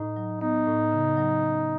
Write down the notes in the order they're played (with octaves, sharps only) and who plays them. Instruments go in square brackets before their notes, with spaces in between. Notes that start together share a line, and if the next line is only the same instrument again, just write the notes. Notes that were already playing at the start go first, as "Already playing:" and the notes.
Already playing: [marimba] A2 [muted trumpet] D#4
[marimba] F#3
[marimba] B3 [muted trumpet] D#4
[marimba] A2
C#3
F#3
C#4